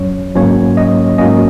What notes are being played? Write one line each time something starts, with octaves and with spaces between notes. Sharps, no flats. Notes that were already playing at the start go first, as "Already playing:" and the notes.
Already playing: F#2 F#3 C#4 C#5
G#2 F#3 A#3 C#4 C#5
D#5
G#2 F#3 A#3 C#4 D#5